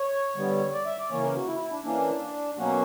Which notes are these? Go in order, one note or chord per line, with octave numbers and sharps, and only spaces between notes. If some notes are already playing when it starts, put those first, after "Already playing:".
Already playing: C#5
D3 G3 B3
D5
E5
D5
C#3 E3 A#3 C#4 C#5
A#4
F#4
E4
E4
D4
E3 A#3 C#4 D4
B2 F#3 A#3 C#4 F#4